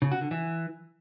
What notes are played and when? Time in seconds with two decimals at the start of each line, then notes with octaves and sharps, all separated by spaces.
0.02 C#3
0.12 F#4
0.21 D3
0.31 E3